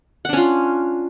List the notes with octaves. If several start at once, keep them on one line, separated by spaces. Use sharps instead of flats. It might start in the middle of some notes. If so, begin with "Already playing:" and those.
C#4 D4 F4 F#5